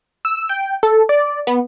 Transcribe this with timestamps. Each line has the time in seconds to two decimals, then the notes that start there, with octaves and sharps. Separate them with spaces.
0.25 E6
0.49 G5
0.83 A4
1.09 D5
1.47 B3